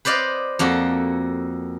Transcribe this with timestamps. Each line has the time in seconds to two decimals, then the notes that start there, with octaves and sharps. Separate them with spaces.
0.05 B4 C5 D5 D#5 F5
0.59 F2 A#3 F#4 A4